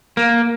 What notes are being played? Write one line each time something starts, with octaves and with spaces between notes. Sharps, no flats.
A#3